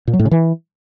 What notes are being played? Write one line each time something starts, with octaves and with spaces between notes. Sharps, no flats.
A#2
F#3
A2
C#3
E3